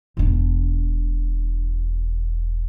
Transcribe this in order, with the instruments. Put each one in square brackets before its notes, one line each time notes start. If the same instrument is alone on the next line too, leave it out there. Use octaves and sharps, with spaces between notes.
[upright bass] E1 D4